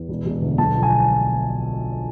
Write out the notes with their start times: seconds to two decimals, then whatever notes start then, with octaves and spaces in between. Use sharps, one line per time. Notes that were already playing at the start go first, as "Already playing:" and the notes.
Already playing: E2
0.09 E1
0.26 E1
0.42 D2
0.58 B1 A5
0.74 F3
0.83 G#5